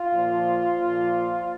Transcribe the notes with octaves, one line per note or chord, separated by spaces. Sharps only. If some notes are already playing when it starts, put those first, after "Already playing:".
Already playing: F4
A#2 F3
A#2 F3